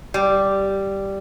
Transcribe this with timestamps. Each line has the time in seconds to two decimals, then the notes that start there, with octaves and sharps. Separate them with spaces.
0.14 G3